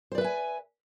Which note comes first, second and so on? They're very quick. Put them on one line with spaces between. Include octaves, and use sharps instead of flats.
C5 D5 B4 E5 G#5